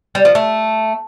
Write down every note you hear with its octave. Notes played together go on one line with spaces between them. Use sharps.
G3
F3
A3